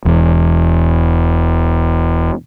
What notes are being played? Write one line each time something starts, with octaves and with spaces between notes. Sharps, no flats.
E1 E2